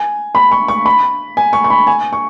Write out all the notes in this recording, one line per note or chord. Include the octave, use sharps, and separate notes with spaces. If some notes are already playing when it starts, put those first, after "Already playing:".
Already playing: G#5
B5
C#6
C#6
B5
G#5
C#6
C#6
B5
G#5
C#6